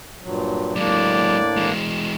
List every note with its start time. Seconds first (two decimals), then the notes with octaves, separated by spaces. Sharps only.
0.23 G2 A#2 F#3
0.76 A2 F#3 G#3 A#3 D4 D5
1.57 E3 G#3